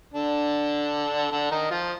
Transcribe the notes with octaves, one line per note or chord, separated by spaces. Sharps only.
D3 D4
D3 D4
D#3 D#4
F3 F4